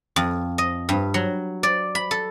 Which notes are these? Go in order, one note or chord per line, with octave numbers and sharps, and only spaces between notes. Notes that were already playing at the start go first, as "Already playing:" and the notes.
F2
D#5
G2
F#3
D5
B5
A4